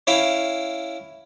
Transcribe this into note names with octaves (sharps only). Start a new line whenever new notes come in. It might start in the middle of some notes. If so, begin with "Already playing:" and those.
C#4 E4 E5 F5 G5